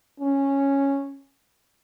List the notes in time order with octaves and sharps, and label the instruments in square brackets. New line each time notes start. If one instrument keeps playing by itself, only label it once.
[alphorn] C#4